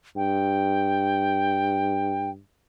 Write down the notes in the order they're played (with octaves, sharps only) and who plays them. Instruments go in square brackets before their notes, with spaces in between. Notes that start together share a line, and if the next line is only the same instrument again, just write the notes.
[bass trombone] G2 [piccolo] G5